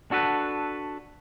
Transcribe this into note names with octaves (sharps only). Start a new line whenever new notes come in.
D4 F#4 A4 B4